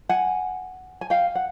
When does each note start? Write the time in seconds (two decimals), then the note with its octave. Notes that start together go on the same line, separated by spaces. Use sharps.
0.09 F#5 G#5
1.01 G#5
1.10 F5 G5
1.35 F#5